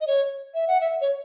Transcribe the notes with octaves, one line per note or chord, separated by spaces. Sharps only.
D#5
C#5
E5
F#5
E5
C#5